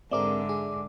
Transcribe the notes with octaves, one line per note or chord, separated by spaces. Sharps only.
G#2 D3 C4 G#4 A#4 D5 E5 D6
G#4